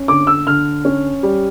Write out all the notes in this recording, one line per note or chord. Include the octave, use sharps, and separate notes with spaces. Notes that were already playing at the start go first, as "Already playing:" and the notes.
Already playing: C#4
D3 D6
E6
D3 F6
C#4
G3